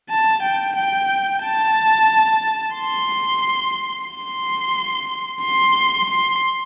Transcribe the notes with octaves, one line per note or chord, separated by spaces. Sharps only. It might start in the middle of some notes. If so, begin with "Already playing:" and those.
A5
G5
G5
A5
C6
C6
C6
C6